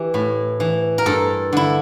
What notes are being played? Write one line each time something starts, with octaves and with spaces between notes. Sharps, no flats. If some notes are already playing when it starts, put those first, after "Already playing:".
Already playing: E3 G4
A2
E3
A#4
G2 A4
D3 E4